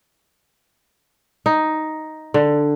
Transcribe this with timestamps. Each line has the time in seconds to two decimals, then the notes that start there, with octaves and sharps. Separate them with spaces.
1.46 D#4
2.34 D3